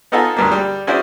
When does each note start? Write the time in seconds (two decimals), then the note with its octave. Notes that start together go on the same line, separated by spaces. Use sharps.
0.12 B3 D#4 F4 A4 F#5 G#5
0.37 D2 G2 A#3
0.52 G3
0.87 C#4 E4 F#4 G#4 C5 D5